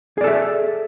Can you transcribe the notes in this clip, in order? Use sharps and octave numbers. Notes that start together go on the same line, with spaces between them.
G#4 A4 D5 E5